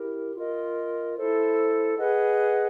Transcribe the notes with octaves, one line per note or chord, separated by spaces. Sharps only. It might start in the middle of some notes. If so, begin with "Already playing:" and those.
Already playing: E4 G4 A#4
F4 A#4 D#5
E4 A4 C5
G#4 B4 D#5 F#5